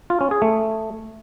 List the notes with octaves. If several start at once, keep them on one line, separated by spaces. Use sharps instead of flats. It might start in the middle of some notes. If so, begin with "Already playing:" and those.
F4
C#4
G#4
A3